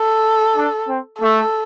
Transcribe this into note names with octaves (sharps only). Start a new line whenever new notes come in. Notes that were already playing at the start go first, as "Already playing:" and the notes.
Already playing: A4
D4
C4
A3 A4